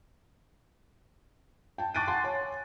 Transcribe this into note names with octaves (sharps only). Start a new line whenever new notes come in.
G5 A5
C#6 D6 F#6 A6 D7 D#7
F#5 G#5 A5 C6
C#5 G#5